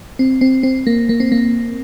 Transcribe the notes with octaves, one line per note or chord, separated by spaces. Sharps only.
C4
C4
C4
A#3
A#3
C4
A#3